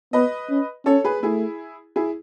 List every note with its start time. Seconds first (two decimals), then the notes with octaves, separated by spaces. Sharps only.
0.13 B3 B4 D#5
0.50 C#4
0.86 C#4 A4 C#5
1.04 G#4 B4
1.23 A3 E4 G#4
1.96 E4 G#4